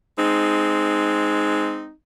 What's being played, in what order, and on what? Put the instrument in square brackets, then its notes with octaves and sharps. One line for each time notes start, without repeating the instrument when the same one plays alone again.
[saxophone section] G#3 C4 D#4